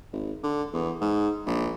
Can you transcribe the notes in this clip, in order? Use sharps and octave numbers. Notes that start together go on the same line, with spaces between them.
G#1
D3
E2
G#2
A#1